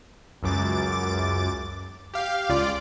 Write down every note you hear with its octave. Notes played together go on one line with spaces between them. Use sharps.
C#2 F#2 D6 A6
G4 F5
C#2 F4 D5 D6